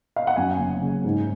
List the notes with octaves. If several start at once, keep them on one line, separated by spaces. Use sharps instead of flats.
F5
F#5
F#2 G#5
F#1
C#3
G#2